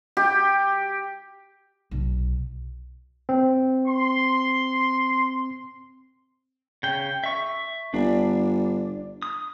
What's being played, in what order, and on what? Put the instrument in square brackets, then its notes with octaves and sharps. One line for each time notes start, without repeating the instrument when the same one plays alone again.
[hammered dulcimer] G4
[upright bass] B1
[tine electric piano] C4
[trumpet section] C6
[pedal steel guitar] C#3 G5
E5 C#6
[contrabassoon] G1 [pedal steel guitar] D4
[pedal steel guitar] D#6